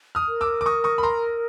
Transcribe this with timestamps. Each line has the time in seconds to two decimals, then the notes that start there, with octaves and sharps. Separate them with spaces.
0.15 D#6 F6
0.28 A#4
0.41 D6 E6
0.61 D6
0.66 C#6 D#6
0.84 C#6 D#6
0.98 B5
1.03 A#5 C6